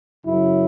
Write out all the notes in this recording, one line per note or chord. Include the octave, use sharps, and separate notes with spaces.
F#2 C#3 F#3 E4